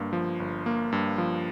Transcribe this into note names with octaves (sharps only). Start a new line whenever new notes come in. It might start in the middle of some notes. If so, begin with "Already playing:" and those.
Already playing: G1 G2 A#3
F3
G1
A#3
G2
F3